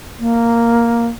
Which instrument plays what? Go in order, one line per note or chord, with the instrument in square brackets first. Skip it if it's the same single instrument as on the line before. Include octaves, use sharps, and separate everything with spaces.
[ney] A#3